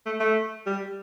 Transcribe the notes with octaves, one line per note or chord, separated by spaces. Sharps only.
A3
A3
G3